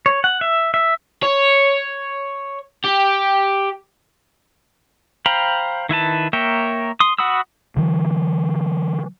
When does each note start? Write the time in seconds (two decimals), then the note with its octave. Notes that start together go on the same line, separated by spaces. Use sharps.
0.06 C#5
0.24 F#5
0.41 E5
0.74 E5
1.23 C#5
2.84 G4
5.26 C5 F5 G5 A#5 B5
5.89 D#3 E4 B4 A5
6.33 A#3 A#4 C#5 E5 G5
7.00 C6 D#6
7.18 F#4 F#5 B5 D#6 E6
7.77 D3 E3 F#3